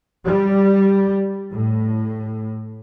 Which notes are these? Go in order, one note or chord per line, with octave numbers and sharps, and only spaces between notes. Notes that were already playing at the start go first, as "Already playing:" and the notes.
G3
A2